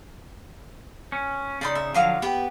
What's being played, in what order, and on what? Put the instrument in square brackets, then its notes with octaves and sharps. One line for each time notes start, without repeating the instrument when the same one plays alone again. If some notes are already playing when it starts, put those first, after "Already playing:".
[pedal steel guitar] C#4
[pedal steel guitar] C#3 D#4 [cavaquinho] D5 B5 C6
[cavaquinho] E5
[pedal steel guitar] D3 F3 F#3 [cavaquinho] F#4 F5 D6
[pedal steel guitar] B3 [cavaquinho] G4 B4